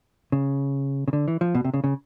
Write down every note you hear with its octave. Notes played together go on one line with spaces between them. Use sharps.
C#3
C#3
D3
E3
F3
B2
C3
C#3
C#3